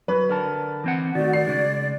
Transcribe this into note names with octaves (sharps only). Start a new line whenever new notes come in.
F#3 B4
D3 A#4 A5
E3 C4 F#5
D#3 A3 F#4 D5
D5 C7
C#3 G#3